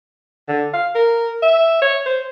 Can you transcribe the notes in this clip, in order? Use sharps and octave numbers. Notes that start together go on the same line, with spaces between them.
D3
F5
A#4
E5
C#5
C5